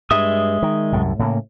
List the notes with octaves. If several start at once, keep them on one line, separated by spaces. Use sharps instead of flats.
G2 G#3 E5 D#6
D#3
C2 F#2 A2
A2 C#3 A#3